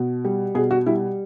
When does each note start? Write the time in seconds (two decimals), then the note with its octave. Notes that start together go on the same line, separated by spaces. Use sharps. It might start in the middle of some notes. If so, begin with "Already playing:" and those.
Already playing: B2
0.25 G3
0.55 B2 G#4
0.71 F#4
0.86 G3 E4